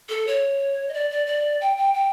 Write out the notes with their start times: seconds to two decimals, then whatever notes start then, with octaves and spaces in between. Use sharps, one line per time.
0.09 A4
0.27 C#5
0.89 D#5
0.94 D5
1.11 D5
1.27 D5
1.61 G5
1.77 G5
1.94 G5